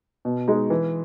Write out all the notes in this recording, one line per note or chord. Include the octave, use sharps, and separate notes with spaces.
B2
G#3 D#4
E3